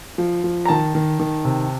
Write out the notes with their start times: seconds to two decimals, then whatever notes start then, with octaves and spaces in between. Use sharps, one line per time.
0.18 F3
0.44 F3
0.65 A#5
0.69 D#3 A5
0.95 D#3
1.20 D#3
1.45 C3